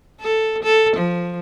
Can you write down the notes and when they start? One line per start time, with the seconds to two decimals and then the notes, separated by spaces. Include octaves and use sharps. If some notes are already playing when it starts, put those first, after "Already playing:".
0.21 A4
0.63 A4
0.96 F3